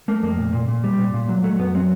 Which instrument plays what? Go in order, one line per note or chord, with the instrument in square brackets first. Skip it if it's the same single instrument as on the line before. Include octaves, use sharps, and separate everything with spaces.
[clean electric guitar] A3 A#3
F2 A#3
A#2
A#2
A#2
G3
A#2
A#2
F#3
F#3 A3
F#2 B3
F#3 C4